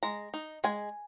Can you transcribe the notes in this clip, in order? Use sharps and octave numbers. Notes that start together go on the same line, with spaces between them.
G#3 A#5
D#4
G#3 G#5